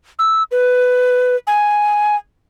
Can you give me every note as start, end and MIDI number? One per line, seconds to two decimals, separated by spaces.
0.19 0.43 88
0.51 1.36 71
1.47 2.16 80